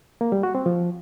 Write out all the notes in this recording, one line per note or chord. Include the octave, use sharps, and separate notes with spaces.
A#3
G3
F#4
C4
F3